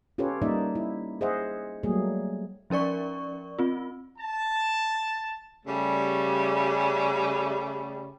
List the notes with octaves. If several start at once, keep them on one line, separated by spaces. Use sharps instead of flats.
C#4 F4 G4 A4 B4 C#5
G3 A#3 D#4 D5 E5
E4
G#4 C5 D#5 E5 F#5
F#3 G3 A3 A#3 G#4
F3 C#4 A#4 D5 C#6
C4 F4
A5
C#3 G3 A3